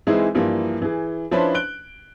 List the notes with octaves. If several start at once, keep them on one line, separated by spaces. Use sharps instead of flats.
E3 G#3 C4 D#4 E4 G#4
G2 E3 F3 A#3
E3 G#4
F3 C#4 D4 E4 B4 C5
F#6 D7 G7